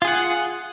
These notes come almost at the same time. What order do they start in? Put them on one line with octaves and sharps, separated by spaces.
F4 G#4 F#5